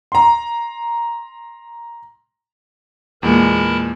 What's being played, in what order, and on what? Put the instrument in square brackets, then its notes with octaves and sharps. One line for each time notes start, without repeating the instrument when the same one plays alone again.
[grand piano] A#5 C6
[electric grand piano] E2 A#2 [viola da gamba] G#3 A#3 [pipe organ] A#4 A5 B5